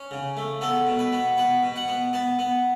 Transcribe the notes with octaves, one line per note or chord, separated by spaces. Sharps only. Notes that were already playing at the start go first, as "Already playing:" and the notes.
Already playing: C#4
C#3
A3
B3 A4
B2
B4
B3
B2 B4
B2
F#5
B3
B3 A5
B3